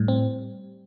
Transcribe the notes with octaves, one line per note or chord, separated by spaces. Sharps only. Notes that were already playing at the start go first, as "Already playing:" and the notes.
Already playing: A2 G3
C4